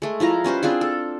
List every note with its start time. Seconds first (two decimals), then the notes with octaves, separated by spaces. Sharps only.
0.02 G#3 A3
0.20 F3 E4 F4 A#5
0.44 G3 C#4 B4 C5
0.63 C4 D4 F4 G#4
0.81 A4